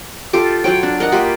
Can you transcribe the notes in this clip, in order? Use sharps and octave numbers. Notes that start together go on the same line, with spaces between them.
F4 G4 A4 D6
F#3 F4 C#5 G5
D4
A#4 D#5 F#5
A#3 F4 G4 B5